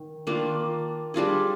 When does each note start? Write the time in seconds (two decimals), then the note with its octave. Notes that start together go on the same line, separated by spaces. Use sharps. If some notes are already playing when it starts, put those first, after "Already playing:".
Already playing: D#3
0.27 D#3 A#3 D4 F4
1.14 G3 D4 F4 G#4